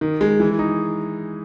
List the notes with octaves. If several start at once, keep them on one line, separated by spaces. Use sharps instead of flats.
D#3
G#3
E3
D#4